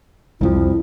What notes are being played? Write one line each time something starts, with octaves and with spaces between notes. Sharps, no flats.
C2 F2 F3 E4